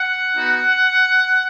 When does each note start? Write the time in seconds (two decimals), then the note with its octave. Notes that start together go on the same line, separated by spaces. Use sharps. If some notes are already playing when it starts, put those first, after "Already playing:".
Already playing: F#5
0.35 B3 D#4 F#4